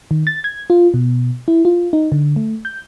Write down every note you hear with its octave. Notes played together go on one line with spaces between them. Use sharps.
D#3
A6
G#6
F4
B2
E4
F4
D#4
D3
A3
G6